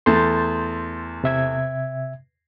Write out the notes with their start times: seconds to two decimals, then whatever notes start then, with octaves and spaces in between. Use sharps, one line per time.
0.06 E2 A3 A4 C6 G6 A6
1.24 C3 E5 G#6